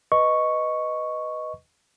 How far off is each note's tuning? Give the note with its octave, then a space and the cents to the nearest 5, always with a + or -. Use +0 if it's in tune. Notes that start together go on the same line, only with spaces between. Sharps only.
B4 +0 D#5 +0 C#6 +0